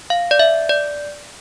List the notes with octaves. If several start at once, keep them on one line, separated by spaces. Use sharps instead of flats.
F5
D5
E5
D5